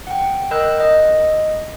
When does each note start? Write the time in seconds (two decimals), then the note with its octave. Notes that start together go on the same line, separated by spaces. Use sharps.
0.07 F#5 G5
0.51 A#4 D#5 B5 E6 F#6 G6
0.80 D#5